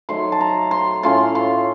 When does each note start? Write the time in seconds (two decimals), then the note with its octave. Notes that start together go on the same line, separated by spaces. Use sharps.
0.09 D#3 F#3 A3 C6
0.32 A5
0.41 A#5
0.71 C6
1.03 A2 A3 C#4 F4 C6
1.35 C6